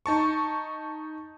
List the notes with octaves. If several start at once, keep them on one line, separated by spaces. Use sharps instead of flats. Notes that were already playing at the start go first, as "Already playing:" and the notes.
D#4 A5 C#6